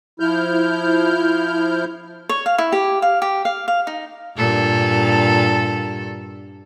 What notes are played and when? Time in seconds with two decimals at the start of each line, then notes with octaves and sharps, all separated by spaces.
0.20 F3 E4 F6 G6
2.29 C#5
2.46 F5
2.58 E4
2.72 G4
3.02 F5
3.22 G4
3.45 F5
3.68 F5
3.87 D#4
4.36 G2 A#2 A4